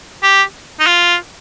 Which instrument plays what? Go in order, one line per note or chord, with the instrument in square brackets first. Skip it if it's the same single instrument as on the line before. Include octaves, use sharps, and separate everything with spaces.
[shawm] G4
D#4
F4